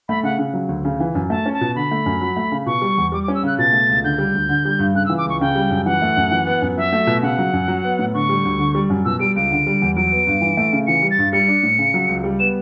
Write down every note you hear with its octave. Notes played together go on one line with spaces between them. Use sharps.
A3 B5
C#3 F#5
C#3
F#3
D2
C#3
E3
F#2
A3 A5
C#4
A5
B2
D3 B5
A3
F#2
F#3
A3
C#3
B2 C#6
G3
E2
G3 D6
C#4 D6
E6
C#3 F#6
B2 A6
A3
C#2
D3 G6
G3
D2
D3
G3
G2
C#3 F#6
E3 E6
D6
C#2 C#6
C#3 G5
G3
F#2
E3 F#5
A3
F#2
E3
B3
F#2
F#3 E5
A3
B2
C#3 F#5
F#3
F#2
F#3
B3
A2
D3 C#6
G3
D2
D3
G3
F#2
B2 E6
G3 D7
C#2 D7
D3
G3
E2
F#3 D7
B3
G2
E3
A3
C#3
E3 C#7
G3
A6
G2
G3 C#7
D4
A2
C#3
F#3
C#2
G3
B3 E7